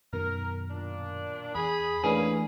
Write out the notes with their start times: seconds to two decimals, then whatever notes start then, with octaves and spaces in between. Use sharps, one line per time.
0.13 F#2 B2 D#3 A#4
0.71 A#2 D4
1.55 E2 G#4 B5
2.04 E3 A3 A#3 C#4 D4 G#4 B4